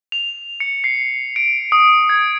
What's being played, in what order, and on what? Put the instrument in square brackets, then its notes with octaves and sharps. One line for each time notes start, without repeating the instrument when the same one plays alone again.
[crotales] F7
C#7
C7
D7
D#6
G#6